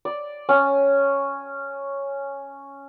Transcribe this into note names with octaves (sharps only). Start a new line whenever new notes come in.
D5
C#4